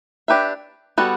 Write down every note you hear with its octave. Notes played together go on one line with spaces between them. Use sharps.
D4 G4 B4 E5
G3 B3 F#4 A4